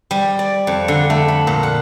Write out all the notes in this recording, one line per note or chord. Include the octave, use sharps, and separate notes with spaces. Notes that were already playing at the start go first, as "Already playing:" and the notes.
G3
D5
F2
D3
A3
B5
A#2
F#5